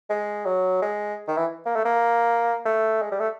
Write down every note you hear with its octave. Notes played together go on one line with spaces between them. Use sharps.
G#3
F#3
G#3
D#3
E3
A#3
A3
A#3
A3
G#3
G3
A3